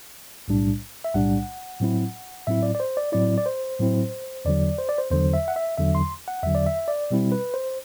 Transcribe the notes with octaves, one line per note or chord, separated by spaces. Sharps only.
B1 A2 G3 D4
E5
B1 A2 G3 D4 F#5
A2 F#3 C4 E4
A2 F#3 C4 E4 E5
D5
D5
C5
D5
A2 F#3 C4 E4 D5
D5
C5
A2 F#3 C4 E4
E2 D3 F#3 D5
C5
D5
C5
E2 D3 F#3 C5
E5
F#5
E5
E2 D3 F#3 E5
C6
F#5
E2 D3 F#3 E5
D5
E5
D5
B2 G3 C4 E4
B4
C5